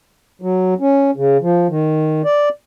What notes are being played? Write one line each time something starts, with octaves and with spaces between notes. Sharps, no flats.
F#3
C#4
C#3
F3
D#3
D5